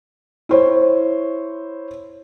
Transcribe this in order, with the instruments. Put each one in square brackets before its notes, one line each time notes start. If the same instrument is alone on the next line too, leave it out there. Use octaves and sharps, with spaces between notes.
[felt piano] E4 C5 C#5